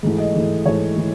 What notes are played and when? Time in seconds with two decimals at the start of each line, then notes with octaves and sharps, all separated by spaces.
0.03 G#2 E3 A3
0.18 D#5
0.35 G#2 E3 A3
0.65 G#2 E3 A3 C#5
0.96 E3 A3